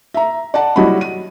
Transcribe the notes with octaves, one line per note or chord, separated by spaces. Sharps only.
E5 A#5
D5 F#5 A5
F#3 G3 E4 F#4 D#5 B5
D#7